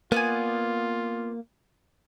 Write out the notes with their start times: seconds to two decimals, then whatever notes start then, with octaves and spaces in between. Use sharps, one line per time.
0.12 A#3 B3 F4 D5 G#5